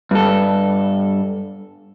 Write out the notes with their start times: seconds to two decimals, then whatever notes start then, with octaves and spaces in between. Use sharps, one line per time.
0.11 G2 A4